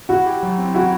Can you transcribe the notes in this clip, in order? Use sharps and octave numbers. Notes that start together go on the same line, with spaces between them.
E4 F#4
G4
F#3
C4
E4 F#4